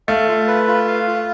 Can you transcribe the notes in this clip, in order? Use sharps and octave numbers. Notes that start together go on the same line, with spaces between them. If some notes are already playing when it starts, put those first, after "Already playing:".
A3 F5
F4
B4
F4
F5
F4